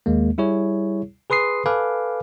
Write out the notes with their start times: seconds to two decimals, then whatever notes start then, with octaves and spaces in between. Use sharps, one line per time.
0.06 D#2 G#3 A#3
0.38 G3 E4 G#4 C#5
1.30 G#4 B4 C6 D#6 C7
1.66 A4 B4 F5 G#5 D6